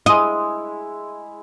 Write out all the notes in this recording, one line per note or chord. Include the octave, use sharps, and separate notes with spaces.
G#3 E4 D#5